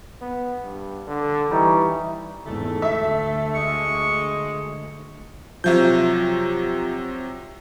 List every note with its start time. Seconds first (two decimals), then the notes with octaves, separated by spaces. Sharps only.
0.21 B3
0.63 G2
1.07 D3
1.51 E3 G3 D#4 C#5
2.46 E2 G#2 D#3 A3 A4
2.82 D2 D3 E5
3.55 G#3 C#6
5.64 C3 F3 F#3 E5 G6